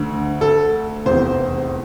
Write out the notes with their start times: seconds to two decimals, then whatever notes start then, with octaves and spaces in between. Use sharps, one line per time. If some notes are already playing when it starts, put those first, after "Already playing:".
Already playing: D2 D3
0.41 A4
1.06 F1 E2 C3 E3 C5